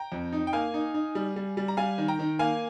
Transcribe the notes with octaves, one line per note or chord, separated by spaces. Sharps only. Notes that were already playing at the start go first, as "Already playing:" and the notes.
Already playing: G5 A#5
F2
D#4
G5
A#3 F5 G#5
D#4
D#4
G3
G3
G3
A#5
G3 F5 G#5
D#3
G5 A#5
D#3
A#3 F5 G#5